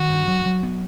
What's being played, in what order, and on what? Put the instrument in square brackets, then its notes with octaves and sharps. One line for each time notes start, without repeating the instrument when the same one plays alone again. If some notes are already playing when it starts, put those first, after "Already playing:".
Already playing: [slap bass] D#3 [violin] F#4
[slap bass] G2
F#3
F#3
B3